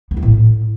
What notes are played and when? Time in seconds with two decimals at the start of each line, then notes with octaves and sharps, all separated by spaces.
0.11 B3
0.17 F3
0.22 A2